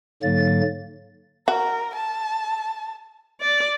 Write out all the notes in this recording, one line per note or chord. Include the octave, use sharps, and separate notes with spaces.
G#2 D3 F#3 A#3 A6
F#4 A#4
A5
D5